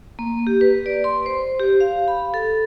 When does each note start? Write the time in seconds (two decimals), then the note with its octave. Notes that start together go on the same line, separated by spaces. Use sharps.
0.19 A#3
0.47 G4
0.61 B4
0.86 D5
1.04 C6
1.26 C5
1.59 G4
1.80 F5
2.08 B5
2.34 A4